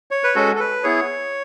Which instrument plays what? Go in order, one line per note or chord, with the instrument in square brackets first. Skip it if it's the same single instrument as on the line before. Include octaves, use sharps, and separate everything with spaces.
[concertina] C#5
B4
G#3 C#4 F#4 A4
A4
B4
B3 E4 G#4 C#5